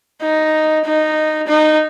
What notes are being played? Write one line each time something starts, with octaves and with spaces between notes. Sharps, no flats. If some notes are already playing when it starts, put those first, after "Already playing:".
D#4
D#4
D#4